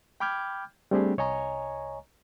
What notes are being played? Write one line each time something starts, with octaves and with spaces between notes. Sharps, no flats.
G5 B5 D6 F6 G6 G#6
G3 A3 C4 D4 G4 G#4
C2 C#5 D#5 G#5 A#5 C#6